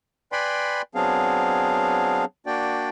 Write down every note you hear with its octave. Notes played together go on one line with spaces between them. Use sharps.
B4 D5 G5 G#5 B5 C6
F#3 B3 C4 D4 G#4 F5
A#3 D4 F#4 D5 G5